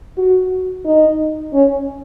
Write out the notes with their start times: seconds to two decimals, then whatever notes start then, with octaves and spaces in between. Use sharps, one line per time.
0.17 F#4
0.85 D#4
1.53 C#4